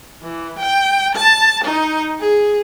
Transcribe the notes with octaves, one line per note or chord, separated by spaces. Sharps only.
E3
G5
A5
D#4
G#4